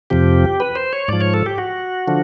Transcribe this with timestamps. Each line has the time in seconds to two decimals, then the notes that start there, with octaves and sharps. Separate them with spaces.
0.10 F2 C3 F3 G4
0.60 B4
0.76 C5
0.93 C#5
1.08 G#2 F3 D5
1.21 C#5
1.34 A4
1.46 G4
1.58 F#4
2.08 D3 F3